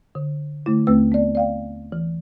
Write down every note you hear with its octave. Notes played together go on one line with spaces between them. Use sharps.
D3
D3 A3 E4
D#2 A3 C4 B4 E6
B3 D5
D5 F5 G5
E3